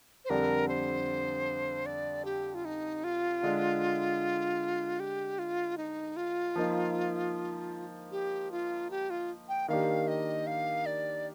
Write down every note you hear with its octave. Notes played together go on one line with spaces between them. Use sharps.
C5
F2 D3 G3 D4 A#4
C5
D5
G4
F4
D#4
F4
D3 G#3 D4
G4
F4
D#4
F4
F3 A#3 D#4
G4
F4
G4
F4
G5
D#3 A#3 D4 G4 F5
D#5
F5
D5